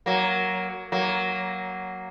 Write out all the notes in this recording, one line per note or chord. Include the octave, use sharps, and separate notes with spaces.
F#3 A#3
F#3 A#3